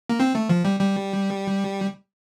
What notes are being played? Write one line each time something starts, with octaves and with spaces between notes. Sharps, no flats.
A#3
C4
A3
F3
G3
G3